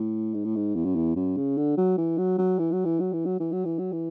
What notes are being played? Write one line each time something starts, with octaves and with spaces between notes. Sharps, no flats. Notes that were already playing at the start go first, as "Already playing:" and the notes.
Already playing: A2
G#2
A2
G#2
E2
F#2
E2
F#2
C#3
D3
F#3
E3
F#3
F#3
E3
F#3
E3
F#3
E3
F#3
E3
F#3
E3
F#3
E3